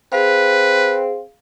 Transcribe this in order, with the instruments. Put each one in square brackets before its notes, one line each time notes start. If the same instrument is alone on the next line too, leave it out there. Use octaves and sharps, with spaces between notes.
[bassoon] C4 [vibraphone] G#4 F5 [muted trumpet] B4